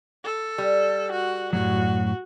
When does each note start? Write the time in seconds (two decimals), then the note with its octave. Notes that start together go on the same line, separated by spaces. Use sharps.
0.25 A4
0.58 G3
1.12 F#4
1.53 F#2 A2 F#3 F#4